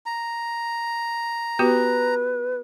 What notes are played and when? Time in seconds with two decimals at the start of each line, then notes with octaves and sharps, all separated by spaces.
0.06 A#5
1.59 B3 F#4 G4 B4